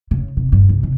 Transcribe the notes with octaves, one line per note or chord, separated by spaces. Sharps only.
C#3
C3
G2
C2
C3